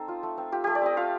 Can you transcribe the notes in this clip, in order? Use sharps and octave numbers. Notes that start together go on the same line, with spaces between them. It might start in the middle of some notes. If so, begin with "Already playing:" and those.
Already playing: C4 D#4 A4 C5
F4
A3
C4
F4 G4
A3 G4
D5
C4 D#5
F4 F5